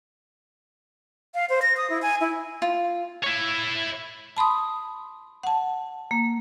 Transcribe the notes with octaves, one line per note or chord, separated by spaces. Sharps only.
F5
C5
A#6
D#6
E4
G#5
E4
F4
E4 C#5
A5 B5 C6 D#6
F#5 A5
A#3